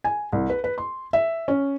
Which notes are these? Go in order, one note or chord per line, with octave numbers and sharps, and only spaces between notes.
G#5
C2
B4
B4
C6
E5
C#4